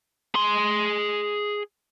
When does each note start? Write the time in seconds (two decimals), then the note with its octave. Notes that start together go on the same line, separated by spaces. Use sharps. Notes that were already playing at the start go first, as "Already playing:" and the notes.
0.35 G#4 C6